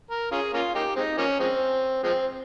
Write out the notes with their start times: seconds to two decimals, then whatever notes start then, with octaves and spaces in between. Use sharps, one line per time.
0.10 A#4
0.32 C#4 F4 G#4
0.54 A#3 C#4 F4
0.75 A#3 D#4 G4
0.96 G#3 C4 D#4
1.18 F3 A#3 C#4
1.39 F3 G#3 C4
2.03 F3 G#3 C4